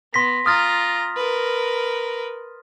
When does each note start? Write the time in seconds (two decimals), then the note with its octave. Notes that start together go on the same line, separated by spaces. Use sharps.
0.14 B3 C6 A#6 B6
0.46 F4 A#5 D#6 F6 A6
1.16 A#4 B4